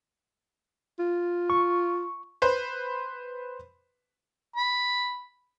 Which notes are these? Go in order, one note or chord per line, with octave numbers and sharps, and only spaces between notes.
F4
C#6
B4 C5
B5